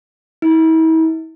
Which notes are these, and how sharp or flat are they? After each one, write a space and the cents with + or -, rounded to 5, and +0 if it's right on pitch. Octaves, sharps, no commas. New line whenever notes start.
E4 -40